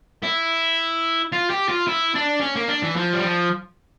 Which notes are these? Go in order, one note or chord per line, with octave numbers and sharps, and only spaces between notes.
E4
F4
G4
F4
E4
D4
C#4
A#3
D4
E3
F3
G3
F3